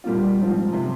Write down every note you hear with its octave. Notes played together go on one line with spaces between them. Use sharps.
A#2 G3 A#3 F4
G#2 F3 C4 F4
C3 F3